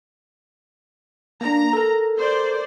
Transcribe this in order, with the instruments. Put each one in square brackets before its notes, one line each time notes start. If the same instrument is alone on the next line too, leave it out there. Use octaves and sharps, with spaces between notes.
[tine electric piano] A#3 D4 [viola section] A#5
[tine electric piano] A4 A#4
[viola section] C5 D5